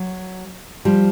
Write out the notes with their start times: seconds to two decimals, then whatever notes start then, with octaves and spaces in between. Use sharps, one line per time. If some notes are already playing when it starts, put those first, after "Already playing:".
Already playing: F#3
0.85 F3 G3